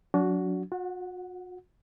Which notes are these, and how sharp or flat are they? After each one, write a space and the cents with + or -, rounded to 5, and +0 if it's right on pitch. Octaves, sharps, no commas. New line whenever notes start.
F#3 -20 D4 -35 F#4 +0
F#4 -45 F#5 +0